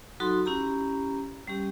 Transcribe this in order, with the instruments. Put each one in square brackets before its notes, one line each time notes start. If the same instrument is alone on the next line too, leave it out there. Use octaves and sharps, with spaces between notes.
[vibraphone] F#3 D#4 F#4 A4 B5 C6
C#4 E4 G4 A#5 B5
G3 C#4 G4